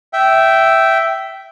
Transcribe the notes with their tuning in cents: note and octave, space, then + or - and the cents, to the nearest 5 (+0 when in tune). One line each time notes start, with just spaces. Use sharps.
E5 +0 G5 -15